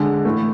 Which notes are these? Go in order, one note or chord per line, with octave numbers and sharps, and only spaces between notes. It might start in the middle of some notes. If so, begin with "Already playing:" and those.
Already playing: D3 G#3 D4
A2 E3 A3